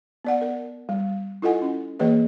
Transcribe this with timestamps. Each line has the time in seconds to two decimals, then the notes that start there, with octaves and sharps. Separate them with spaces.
0.25 B3 D5 F#5
0.41 A#4
0.89 G3
1.42 E4 F4 A4 D#5 F#5 G#5
1.62 C#4
2.00 E3 A#3 G#4 B4 C#5 D#5